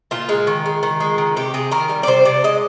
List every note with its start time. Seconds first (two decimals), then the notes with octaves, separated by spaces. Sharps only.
0.11 A#2 F4
0.29 G#3
0.47 D#3
0.66 G#3
0.83 D#3
1.00 G#3
1.18 D#3
1.36 C3 G4
1.54 C3 G#4
1.71 D#3 A#4
1.89 G3
2.03 D5
2.07 C3 C5
2.25 C3 D5
2.44 G#3 D#5